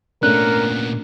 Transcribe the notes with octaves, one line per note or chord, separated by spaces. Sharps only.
A#2 A3 B3 C#4 D4 A#4 F#6